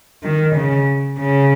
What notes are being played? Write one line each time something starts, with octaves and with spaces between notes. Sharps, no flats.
D#3
C#3
C#3